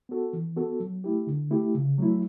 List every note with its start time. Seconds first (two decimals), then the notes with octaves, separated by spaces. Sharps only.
0.09 B3 F#4 A4
0.33 E3
0.56 B3 F#4 A4
0.80 F#3
1.04 A3 E4 G4
1.27 D3
1.51 A3 E4 G4
1.75 C#3
1.98 F#3 A3 E4